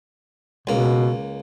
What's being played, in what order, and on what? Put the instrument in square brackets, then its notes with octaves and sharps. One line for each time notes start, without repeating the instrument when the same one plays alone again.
[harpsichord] C#2 A#3 [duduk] B2